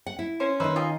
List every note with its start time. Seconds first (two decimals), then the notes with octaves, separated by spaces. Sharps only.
0.07 F#5
0.19 E4
0.40 C#4 C5
0.60 D#3 D#4 B4 C5 E5
0.76 F4 D#5 G#5